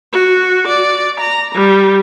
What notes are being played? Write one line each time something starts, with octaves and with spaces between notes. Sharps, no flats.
F#4
D5
A#5
G3